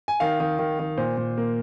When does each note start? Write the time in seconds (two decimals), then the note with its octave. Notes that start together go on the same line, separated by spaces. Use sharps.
0.08 G#5
0.20 D#3 F5
0.40 D#3
0.59 D#3
0.79 D#3
0.97 A#2 C5
1.17 A#2
1.38 A#3